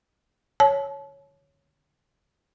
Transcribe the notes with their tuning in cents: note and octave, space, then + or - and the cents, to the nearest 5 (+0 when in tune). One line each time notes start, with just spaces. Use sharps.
C#5 +0 A5 -35